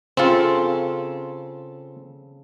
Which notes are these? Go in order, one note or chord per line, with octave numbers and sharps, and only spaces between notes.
C#3 C4 F4 A4